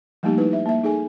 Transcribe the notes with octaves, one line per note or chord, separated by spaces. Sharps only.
F3 G3 A3 A#3 D#4 G4
D#4 E4 B4
E5
A#3 E5
D#4 G#4 A4 G#5